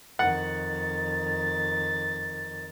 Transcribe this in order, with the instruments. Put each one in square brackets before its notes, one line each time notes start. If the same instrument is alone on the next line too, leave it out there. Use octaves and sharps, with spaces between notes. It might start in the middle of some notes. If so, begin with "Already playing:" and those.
[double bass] F2 D#3 [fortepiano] F#5 [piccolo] A6